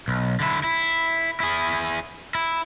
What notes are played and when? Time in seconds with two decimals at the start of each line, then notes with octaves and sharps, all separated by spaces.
0.08 B1
0.40 D3 E4
0.64 E4
1.40 E4 G#4
2.35 E4